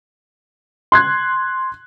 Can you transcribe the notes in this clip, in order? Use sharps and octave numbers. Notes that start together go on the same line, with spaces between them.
C6 F#6 G#6